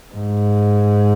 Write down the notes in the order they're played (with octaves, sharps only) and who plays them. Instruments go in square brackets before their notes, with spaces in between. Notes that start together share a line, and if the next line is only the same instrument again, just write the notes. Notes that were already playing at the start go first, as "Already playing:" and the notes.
[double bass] G#2